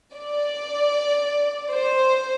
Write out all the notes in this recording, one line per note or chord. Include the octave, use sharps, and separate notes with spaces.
D5
C5